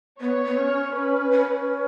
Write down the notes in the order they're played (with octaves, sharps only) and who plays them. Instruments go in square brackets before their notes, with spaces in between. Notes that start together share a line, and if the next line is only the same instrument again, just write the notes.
[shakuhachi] B3 [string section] C#5
[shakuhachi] B3
C#4
[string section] B4
[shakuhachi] C#4